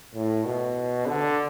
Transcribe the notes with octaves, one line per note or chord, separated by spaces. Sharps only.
A2
B2
D3